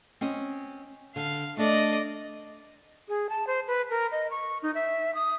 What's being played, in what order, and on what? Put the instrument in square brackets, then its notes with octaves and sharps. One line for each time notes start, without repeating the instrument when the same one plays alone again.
[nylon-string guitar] C4 C#4 D#5
[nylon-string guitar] D3 [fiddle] F5
[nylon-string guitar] A3 D4 A4 [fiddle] D5 D#5
[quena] G#4
A5
C5
B4
A#4
D#5
C#6
D#4
E5
D#6